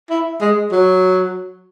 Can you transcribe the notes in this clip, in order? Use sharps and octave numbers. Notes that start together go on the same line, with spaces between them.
E4
G#3
F#3